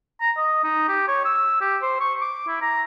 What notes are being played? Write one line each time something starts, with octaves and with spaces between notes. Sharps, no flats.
A#5
D#5
D#4
G4
C#5
E6
G4
C5
C#6
D6
E4
A#5